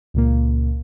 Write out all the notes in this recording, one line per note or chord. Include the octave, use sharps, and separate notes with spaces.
C#2 A#2 A#3